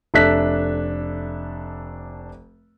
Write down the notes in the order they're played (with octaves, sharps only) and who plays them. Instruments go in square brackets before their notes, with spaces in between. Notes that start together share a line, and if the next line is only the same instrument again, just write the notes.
[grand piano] F1 D4 A4 E5 F#6 B6